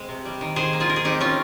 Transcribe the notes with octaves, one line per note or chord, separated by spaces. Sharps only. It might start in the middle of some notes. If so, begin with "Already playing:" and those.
Already playing: G#3 C4
C3
G3
D#3
D#3 G#4 C5
A#3
F4 G#4
D#3 A#4
G#4
C4 D#4 G4
C4 C#4 F4